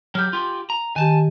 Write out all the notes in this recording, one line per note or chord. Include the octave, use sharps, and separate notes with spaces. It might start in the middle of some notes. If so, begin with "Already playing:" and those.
F#3 G4 F6 G6
F4 G4
A#5
D#3 G4 G#5 A5